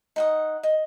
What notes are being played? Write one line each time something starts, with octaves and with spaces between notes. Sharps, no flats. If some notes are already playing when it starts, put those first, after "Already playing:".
D#4 F#5 D#6
D#5